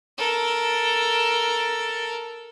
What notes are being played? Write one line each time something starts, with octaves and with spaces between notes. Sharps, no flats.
A4 A#4